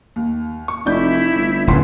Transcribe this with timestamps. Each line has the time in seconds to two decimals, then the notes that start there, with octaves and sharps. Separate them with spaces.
0.16 D#2
0.68 C#6
0.86 F1 D#4 E4 D5 G6
1.35 G1
1.67 D1 B3 C#4 C6